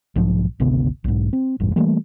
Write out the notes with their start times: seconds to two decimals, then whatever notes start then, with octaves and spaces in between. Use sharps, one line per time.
0.16 B1 G#2 F3
0.60 G#1 D2 C3 B3
1.04 B1 G#2
1.33 C4
1.60 E1 A1 G2
1.76 E3 G3 A3 A#3